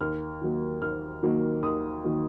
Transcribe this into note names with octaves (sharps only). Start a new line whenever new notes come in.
D#2 F6
D#3 F#3 A#3
D#2 F6
D#3 F#3 A#3
D#2 D#6
D#3 F#3 A#3